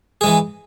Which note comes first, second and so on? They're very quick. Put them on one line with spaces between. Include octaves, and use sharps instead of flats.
G#4 G#3 E3